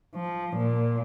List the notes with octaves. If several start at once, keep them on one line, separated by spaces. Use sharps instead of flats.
F3
A#2